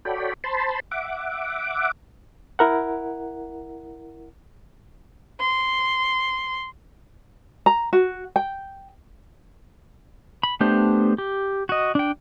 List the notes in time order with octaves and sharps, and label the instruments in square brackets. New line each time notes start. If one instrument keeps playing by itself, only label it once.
[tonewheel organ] F#4 A4 C#5 D5 G5 B5
C5 A5 B5 C6
E5 F#5 D6
[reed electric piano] E4 A#4 F#5
[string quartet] C6
[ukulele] A#5
F#4
G5
[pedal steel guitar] B5
A3 B3 D4 G4 C5
G4
F#4 D#5
D4 G5